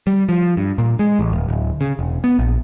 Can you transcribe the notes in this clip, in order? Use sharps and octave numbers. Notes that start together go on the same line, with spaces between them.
G3
F3
G2
A#2
G#3
A1
D#1
D1
C#3
E1
B3
A#1